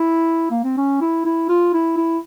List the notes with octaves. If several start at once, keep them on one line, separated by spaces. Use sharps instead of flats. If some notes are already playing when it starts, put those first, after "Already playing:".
Already playing: E4
A#3
C4
C#4
E4
E4
F4
E4
E4